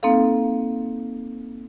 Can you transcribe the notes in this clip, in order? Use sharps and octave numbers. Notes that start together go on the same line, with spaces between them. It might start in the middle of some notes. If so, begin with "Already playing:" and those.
A#3 C4 D#4 A4 F5